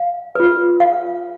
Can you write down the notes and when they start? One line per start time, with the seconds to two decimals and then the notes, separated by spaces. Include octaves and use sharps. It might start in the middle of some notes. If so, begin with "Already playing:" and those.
Already playing: F5
0.35 F4 B4
0.80 F5